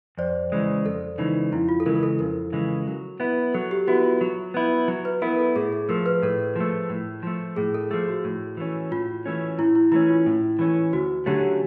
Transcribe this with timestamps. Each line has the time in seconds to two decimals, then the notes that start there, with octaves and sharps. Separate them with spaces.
0.18 F2 C5 D5
0.52 C#3 E3 G#3
0.85 F2 A4
1.18 C#3 E3 G#3 D#4
1.52 F2 E4
1.69 F4
1.80 A4
1.86 C#3 E3 G#3 A#4
2.03 A4
2.19 F2 A#4
2.53 C#3 E3 G#3
2.87 F#3
3.20 B3 E4
3.54 F#3 A4
3.71 G4
3.88 B3 E4 F#4
4.04 F4
4.21 F#3
4.54 B3 E4
4.88 F#3
5.05 B4
5.22 B3 E4 A#4
5.39 A4
5.56 A2 G#4
5.73 G#4
5.89 F3 A3 A#4
6.06 B4
6.23 A2 A4
6.56 F3 A3
6.89 A2
7.23 F3 A3
7.56 A2 G#4
7.74 A4
7.91 F3 A3 G#4
8.08 F#4
8.24 A2
8.57 E3 A3 C#4
8.91 A2 F4
9.26 E3 A3 C#4
9.58 A2 E4
9.75 E4
9.92 E3 A3 C#4 E4
10.09 F4
10.26 A2
10.59 E3 A3 C#4
10.93 D2 F#4
11.26 D3 F#3 A3 C#4 G4